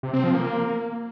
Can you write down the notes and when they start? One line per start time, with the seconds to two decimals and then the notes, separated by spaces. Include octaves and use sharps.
0.03 C3
0.13 C4
0.24 F3
0.34 A#3
0.44 A#3